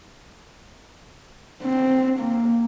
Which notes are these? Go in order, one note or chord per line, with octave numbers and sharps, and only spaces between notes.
C4
A#3